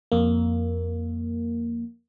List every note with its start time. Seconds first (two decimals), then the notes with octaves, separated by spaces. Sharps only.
0.12 F2 A#3